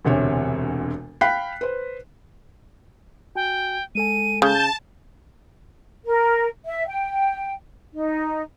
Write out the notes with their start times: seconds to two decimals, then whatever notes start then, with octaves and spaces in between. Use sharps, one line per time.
0.05 E1 D2 C3 C#5
1.21 F5 G5 B5 F#6 B6 C7
1.61 B4 C5
3.36 F#4 G5 G#5
3.95 G#3 A4 G#5 D#7
4.42 C#3 A5 G6
6.05 A#4
6.65 E5
6.86 G5
7.93 D#4